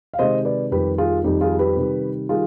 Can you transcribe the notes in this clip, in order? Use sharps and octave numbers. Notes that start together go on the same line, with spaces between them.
F5
C3 D#3 G#3 C5 D#5
B4 D5
F2 D#3 G3 G4 B4
F4 G#4
F2 D#3 G3 D#4 G4
F4 G#4
G4 B4
C3 D#3 G3
D#3 G3 F4 G#4